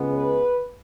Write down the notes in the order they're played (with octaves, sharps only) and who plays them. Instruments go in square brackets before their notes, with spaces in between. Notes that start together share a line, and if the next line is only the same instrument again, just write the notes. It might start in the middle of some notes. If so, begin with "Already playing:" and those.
Already playing: [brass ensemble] C#2 C#3 G#3 B3
B4